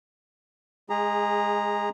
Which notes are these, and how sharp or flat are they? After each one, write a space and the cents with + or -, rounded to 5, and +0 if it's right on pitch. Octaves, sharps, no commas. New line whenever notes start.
G#3 +0 G#4 -25 A#5 +0